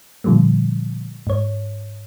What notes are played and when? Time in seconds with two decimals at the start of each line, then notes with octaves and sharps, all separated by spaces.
0.24 A#2 D3 F3 G3 A3
1.27 G#2 C#5